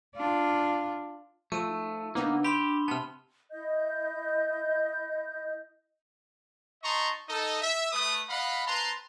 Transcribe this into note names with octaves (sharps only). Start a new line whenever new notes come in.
D4 F4
F3 A3 C#6 E6 D#7
D#4
C#3 A#3 B3 D4 D#4
G4 B5 C6 E7 G7
C3 B3 A5 F6
E4 D#5 G6
D#4 D#5 A5 A#5 C6 C#6
D#4 A4 D#5
E5
A3 B4 D#6
D#5 F5 F#5 B5
C4 B4 A5 A#5 C6